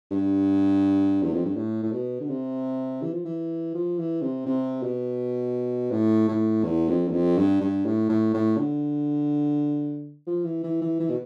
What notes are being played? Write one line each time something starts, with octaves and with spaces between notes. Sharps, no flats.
G2
E2
F2
G2
A2
A2
B2
D3
C3
E3
F3
E3
F3
E3
C3
C3
B2
A2
A2
E2
F2
E2
F2
G2
G2
A2
A2
A2
D3
F3
E3
E3
E3
E3
B2